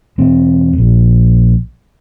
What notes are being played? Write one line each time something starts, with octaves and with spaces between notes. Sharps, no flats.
E1 C4
A#1